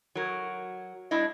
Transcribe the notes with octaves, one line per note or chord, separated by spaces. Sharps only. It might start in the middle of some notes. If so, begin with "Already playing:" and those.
F#3 A#4
G#2 G#3 D4 E4 D#5